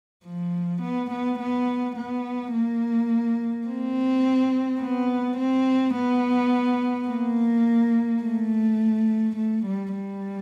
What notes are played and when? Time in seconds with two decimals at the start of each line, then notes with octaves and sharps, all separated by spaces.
0.25 F3
0.82 B3
1.11 B3
1.40 B3
1.97 B3
2.53 A#3
3.67 C4
4.81 B3
5.38 C4
5.95 B3
7.09 A#3
8.23 A3
9.37 A3
9.66 G3
9.95 G3